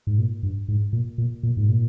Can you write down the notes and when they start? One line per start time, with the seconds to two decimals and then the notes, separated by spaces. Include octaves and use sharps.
0.07 G#2
0.18 A#2
0.43 G2
0.68 G#2
0.93 A#2
1.18 A#2
1.43 A#2
1.57 G#2
1.68 A#2